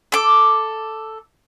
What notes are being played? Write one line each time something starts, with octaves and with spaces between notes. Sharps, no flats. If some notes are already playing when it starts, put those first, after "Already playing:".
A4 D6